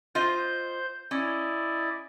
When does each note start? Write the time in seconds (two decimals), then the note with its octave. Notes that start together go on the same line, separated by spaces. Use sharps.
0.15 F4 C5 D#5 G6
1.11 C#4 E4 D5 D#5